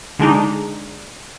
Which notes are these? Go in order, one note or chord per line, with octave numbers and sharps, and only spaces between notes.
D3 G#3 D4 D#4